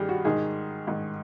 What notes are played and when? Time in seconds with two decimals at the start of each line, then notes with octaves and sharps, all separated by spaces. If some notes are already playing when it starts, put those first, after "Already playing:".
Already playing: G2 D#3 G4 G#4
0.09 F#4
0.25 G#2 D#3 G#4
0.87 G#2 D#3